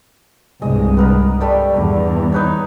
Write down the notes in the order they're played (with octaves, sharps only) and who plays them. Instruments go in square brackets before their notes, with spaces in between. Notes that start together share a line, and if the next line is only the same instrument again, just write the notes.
[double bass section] C2 G2 G#3 [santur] G#4 D#5
[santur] B3 A#4 B4
G3 A3 D5
[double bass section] E2 G2
[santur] D#4 B4 C#5